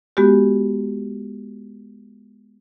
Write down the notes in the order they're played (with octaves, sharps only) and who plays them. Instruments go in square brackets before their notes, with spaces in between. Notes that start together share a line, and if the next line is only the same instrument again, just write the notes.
[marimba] G#3 B3 F#4 G4